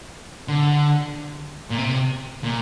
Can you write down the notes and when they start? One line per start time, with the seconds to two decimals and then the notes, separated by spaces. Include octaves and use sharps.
0.48 D3
1.70 A#2
1.78 C3
2.44 A#2